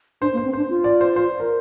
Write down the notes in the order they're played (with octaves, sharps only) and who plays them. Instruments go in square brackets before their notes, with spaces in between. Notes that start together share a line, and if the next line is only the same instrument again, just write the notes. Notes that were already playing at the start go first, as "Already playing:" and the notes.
[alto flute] D4 [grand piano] C5
[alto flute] A#3
[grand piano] C5
[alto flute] C4
[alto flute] D4 [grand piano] C5
[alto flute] F4
[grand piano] D5
C5
C5
A#4